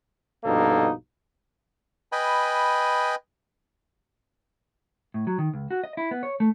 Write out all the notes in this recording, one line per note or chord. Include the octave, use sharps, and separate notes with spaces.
A#1 G2 B2 A#3 D#4 A4
B4 D#5 G5 G#5 B5
A2
F#3
D#3
C#2
F#4
D#5
E4
B3
C#5
A3